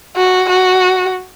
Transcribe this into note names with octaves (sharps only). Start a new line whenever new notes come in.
F#4
F#4